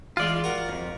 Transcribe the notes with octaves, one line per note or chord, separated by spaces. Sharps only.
E3 G#3 F4 D5
F#4 A#4 A#5
F2 G#2